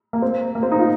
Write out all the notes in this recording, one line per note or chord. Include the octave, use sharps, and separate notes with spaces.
A#3
C4
A#3
C4
D#4
F4